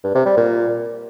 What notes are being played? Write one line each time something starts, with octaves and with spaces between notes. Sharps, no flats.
G2
C3
G3
A#2